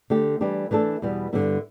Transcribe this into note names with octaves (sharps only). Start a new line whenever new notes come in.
D3 A3 D4 G4
E3 G3 D4 G4
E3 A3 D4 A4
E2 B2 G3 B3
G2 D3 G3 B3 E4